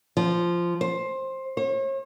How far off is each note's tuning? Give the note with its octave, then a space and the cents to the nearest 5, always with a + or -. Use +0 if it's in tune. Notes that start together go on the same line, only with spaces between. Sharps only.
F3 -10
C5 +15
C#5 -45